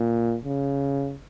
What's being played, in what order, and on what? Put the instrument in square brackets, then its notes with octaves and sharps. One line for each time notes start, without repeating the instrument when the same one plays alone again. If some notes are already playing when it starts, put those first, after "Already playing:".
Already playing: [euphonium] A#2
C#3